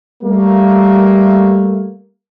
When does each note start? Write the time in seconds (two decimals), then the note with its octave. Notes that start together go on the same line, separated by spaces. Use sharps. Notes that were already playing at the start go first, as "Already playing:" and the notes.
0.23 G3 A3 A#3